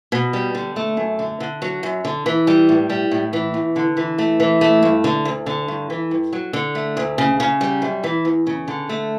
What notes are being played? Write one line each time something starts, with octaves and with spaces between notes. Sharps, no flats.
B2
G3
D3
A3
F#2
D3
D3
F#3
F#2
D3
E3
G3
A2
G3
A2
E3
E2
D3
E3
A3
E3
A3
G2
D3
D2
D3
G2
E3
G2
F#3
D3
A3
D2
C#3
C#3
G3
F#2
E3
E2
C#3
D3
A3